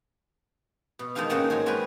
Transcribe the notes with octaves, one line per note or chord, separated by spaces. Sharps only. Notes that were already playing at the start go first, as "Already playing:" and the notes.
B2
D#3 G#3 D4 D#4 G4 F5
G#2 D#3 A#3 C#4 F#5 A5
G#2 F#4 C#5
G#3 C4 F#4 G4 A#4 B4